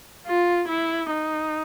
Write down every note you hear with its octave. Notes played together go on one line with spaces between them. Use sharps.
F4
E4
D#4